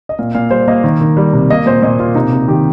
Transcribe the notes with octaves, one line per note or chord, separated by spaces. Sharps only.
D#5
A#2 F5
A#2 F5
G3 C5
A#3 D#5
D#3
D#3
G3
C3
A#3 D#5
A#2 C5
A#2 D#5
A#3 F4
C3 D#4
C3
D#3 G4